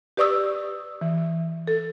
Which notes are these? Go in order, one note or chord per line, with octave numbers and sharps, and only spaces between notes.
G4 B4 D5 C#6 D#6 E6
E3
A4